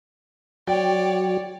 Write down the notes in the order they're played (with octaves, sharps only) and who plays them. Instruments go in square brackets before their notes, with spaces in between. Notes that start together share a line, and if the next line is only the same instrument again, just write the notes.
[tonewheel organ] F#3 F#4 [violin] C#5 D5 [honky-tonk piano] G5